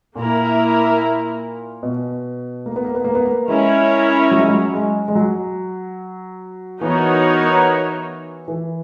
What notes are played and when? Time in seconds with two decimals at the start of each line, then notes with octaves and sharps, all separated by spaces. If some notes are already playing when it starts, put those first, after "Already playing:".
0.16 A#2 A#3 E4 A#4
1.83 B2
2.66 A#3
2.76 B3
2.85 A#3
2.95 B3
3.04 A#3
3.15 B3
3.25 A#3
3.48 G#3 C#4 E4 A#4 C#5
4.31 F#3
4.40 G#3
4.48 F#3
4.74 G#3
5.08 G#3
5.15 F#3
6.81 E3 B3 D#4 F#4 A#4 C#5
8.48 E3